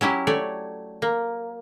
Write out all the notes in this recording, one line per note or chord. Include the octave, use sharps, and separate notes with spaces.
F#3 C#4 E4 G4
A3 C#5 D5
A#3